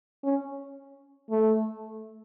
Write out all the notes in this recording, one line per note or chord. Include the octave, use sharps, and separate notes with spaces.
C#4
A3